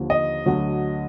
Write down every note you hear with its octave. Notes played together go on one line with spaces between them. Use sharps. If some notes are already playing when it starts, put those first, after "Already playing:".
Already playing: D#2 D3 F3
D#5
D2 D3 F#3